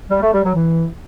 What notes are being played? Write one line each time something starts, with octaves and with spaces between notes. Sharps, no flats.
G3
A3
G3
F#3
E3